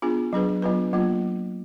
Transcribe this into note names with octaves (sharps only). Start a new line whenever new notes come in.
B3 D4 F4 G#4
F#3 D4 G#4 B4
F#3 B3 D4 F4 B4
F#3 A#3 F4